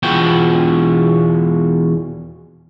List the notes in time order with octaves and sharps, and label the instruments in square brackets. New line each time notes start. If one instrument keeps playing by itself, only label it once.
[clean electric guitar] E2 B2 F4 F#4 B4 G5